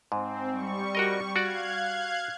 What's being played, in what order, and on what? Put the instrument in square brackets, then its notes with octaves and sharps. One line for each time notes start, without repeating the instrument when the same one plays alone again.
[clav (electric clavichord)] G#2 [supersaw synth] C4
[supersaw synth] G3 C#6
[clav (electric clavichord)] F#4 A#4 D#5
[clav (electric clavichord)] F#4 D5 [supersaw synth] F5 F#6 G#6